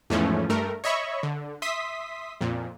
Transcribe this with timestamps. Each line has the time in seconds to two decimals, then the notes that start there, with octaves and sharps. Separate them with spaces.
0.10 E2 G#2 E3 F3 A3 C#4
0.49 G2 A3 A#4
0.84 C#5 D#5 E5 B5 C#6
1.23 D3
1.62 E5 C6 D#6 B6
2.41 F2 A#2